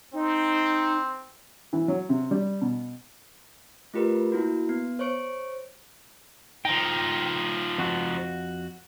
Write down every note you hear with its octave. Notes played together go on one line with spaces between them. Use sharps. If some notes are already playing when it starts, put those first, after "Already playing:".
C4 D#4
E3
F#3
C3
G3
B2
A3 F4 G4 A#4 B4
A#3 E4 F#4
B3
C5 C#5 C#6 D7
F3 D#4 G5
F2 F#4